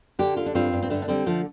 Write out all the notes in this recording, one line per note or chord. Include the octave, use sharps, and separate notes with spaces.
D3 D4 G4
D3 F4
D4
G2 C4 F4
G2
C4
D3 A3 D4
D4
D3 G3 C4
D3 F3 A3